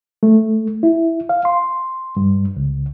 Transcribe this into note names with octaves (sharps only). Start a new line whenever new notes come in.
A3
E4
F5
C6
G2
C#2